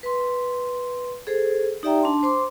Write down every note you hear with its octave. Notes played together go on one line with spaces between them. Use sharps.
B4 C6
G#4 A4 C5
D#4 G4 D5 E5 G5 A#5
D4 A5 C6
C5 C6 D6